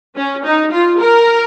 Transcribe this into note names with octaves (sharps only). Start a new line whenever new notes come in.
C#4
D#4
F4
A#4